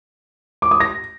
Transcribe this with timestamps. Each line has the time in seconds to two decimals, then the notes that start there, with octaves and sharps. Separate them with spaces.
0.62 D6
0.71 D#6
0.80 A#6